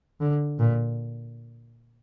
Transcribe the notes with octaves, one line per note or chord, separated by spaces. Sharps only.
D3
A#2